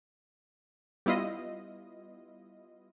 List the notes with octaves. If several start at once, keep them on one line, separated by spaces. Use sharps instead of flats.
G3 B3 E4 F4 D#5